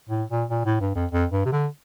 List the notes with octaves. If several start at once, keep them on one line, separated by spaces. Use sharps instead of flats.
A2
A#2
A#2
A2
G2
F2
F2
G2
C3
D3